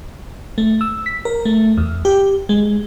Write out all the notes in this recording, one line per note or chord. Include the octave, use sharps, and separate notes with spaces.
A3
E6
B6
A#4
A3
E2
G4
G#3